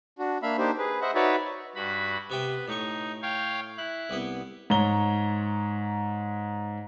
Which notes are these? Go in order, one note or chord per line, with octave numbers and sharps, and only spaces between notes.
D4 F#4
A#3 D4 E5 F5 B5
A#3 D4 D#4 G4 C5
G#4 B4
C5 D#5 E5 F#5
D#4 F#4 B4 C#5 D5 E5
G2 F#4 B5
C3 B3 E5 G5
A2 D#4 C#6
C#5 F5 G5
E4 F#6
C2 B3
G#2 C#5 A#5 G7